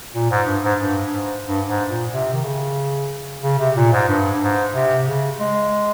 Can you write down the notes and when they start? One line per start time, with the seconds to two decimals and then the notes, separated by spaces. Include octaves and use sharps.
0.15 A#2
0.31 G#2
0.47 G2
0.63 G#2
0.80 G2
1.13 G#2
1.47 G2
1.68 G#2
1.89 A#2
2.12 C3
2.33 D#3
2.44 C#3
3.43 C#3
3.59 C3
3.76 A#2
3.92 G#2
4.08 G2
4.42 G#2
4.74 C3
5.07 C#3
5.40 G#3